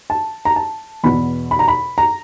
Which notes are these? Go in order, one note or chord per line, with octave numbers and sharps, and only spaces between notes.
A5
A#5
A5
E2 B2 B5
B5
A#5
B5
A#5